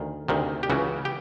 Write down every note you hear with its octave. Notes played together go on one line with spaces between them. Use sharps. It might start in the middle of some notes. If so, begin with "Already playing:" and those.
Already playing: D2 D#3
D2 C3 D#3
G4
C#2 C#3 E3 F#4
G4